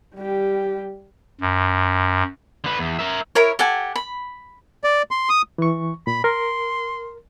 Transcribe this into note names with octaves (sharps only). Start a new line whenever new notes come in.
G3 G4
F#2
D3 B4
E2
A#4 E5
E4 A#4 C#5
G4 A4 F#5 G#5
B5
D5
C6
D#6
E3 C#6
A#2 B5
A#4 C6